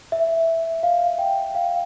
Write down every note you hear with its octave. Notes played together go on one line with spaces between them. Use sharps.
E5
F5
G5
F5